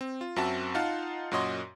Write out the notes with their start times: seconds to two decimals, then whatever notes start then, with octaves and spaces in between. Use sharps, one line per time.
0.01 C4
0.21 F4
0.36 F#2 C4 F#4 E5 A5
0.75 D#4 F4 F5 F#5 A5
1.31 F#2 A#2 F#4 C#5 D#5 C6